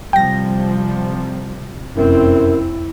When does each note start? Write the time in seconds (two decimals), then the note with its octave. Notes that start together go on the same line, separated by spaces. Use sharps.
0.13 C3 F3 G3 G5 A#6
1.96 F1 F#2 C4 E4